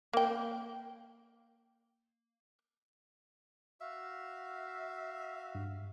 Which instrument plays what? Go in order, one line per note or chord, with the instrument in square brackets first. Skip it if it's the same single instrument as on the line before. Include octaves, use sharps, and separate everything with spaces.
[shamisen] A#3 G5
[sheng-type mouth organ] F#4 F5 [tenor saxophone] E5
[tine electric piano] G2